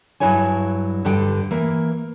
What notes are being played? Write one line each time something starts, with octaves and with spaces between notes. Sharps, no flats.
G2 F3 F#3 E4 C#5 G#5
G2 D3 G3 G5
E3 A#3